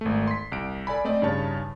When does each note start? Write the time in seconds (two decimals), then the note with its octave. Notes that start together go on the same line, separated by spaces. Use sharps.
0.01 G#1 A3
0.28 C6 B6
0.52 C2 D7
0.87 A4 D5 G#5 B5
1.05 A3 C4 D5 D#5
1.22 G2 C#3 D#4 C#5 A5 A6